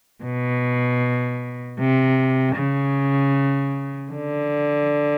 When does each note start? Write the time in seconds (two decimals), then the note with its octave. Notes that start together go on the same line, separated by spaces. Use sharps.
0.24 B2
1.79 C3
2.56 C#3
4.11 D3